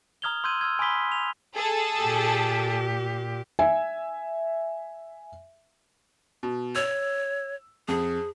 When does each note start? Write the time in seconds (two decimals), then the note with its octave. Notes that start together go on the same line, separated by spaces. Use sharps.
0.22 A#5 D#6 F6 G#6 F7 G7
0.44 C6 E6 G6 G#6 D#7
0.61 E6 F6 G#6
0.79 G#5 B5 C6 D#6 B6 G7
1.12 F7
1.55 G#4 A4 A5
1.99 A#2 G4
3.59 E5 G#5
6.43 B2
6.76 C#5 E6
7.88 F2 G#4